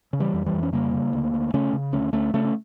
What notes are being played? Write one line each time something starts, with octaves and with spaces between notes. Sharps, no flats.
C#3
E3 G3
F2
E3 G3
F2
C#4
C#3 G3 A#3
C#3
D2
D2
C#3 A3 C#4
C#3
D2 A3 C#4
D2 A3 C#4
C#3 A3 C#4
C#4